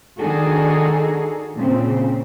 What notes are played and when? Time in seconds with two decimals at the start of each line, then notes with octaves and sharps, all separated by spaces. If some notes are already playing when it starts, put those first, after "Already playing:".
0.18 D#3 D4 D#4 F#4 G#4 A4
1.56 A#2 C#3 C4